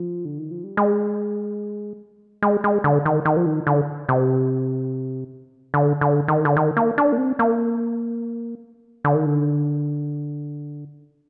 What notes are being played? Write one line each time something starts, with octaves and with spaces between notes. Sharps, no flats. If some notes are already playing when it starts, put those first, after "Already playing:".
Already playing: F3
D3
D#3
F3
G3
G#3
G#3
G#3
D3
D#3
D#3
F3
D#3
D3
C3
D3
D3
D#3
D3
D#3
A#3
D4
A#3
C4
A#3
D3
D#3
D3